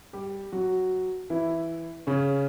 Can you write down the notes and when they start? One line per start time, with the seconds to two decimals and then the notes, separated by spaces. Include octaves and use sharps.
0.13 G3 G4
0.52 F#3 F#4
1.30 E3 E4
2.07 C#3 C#4